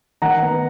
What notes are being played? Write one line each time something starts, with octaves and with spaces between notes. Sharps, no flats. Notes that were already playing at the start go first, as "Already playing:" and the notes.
D#3 F#5 A#5
B3